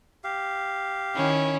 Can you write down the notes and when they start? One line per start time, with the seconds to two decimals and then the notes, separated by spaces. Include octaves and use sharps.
0.24 G4 F5
1.15 D#3 C#4 E4